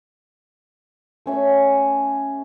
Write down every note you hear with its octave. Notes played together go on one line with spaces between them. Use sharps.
A3 C#4 E5